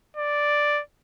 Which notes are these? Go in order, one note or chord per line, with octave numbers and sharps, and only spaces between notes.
D5